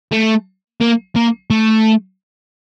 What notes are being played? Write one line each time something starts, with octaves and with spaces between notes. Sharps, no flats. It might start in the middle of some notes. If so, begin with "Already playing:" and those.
A3
A#3
A#3
A3